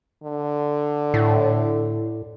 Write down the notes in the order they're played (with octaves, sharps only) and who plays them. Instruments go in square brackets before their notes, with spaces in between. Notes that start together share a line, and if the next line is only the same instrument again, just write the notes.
[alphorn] D3
[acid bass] A2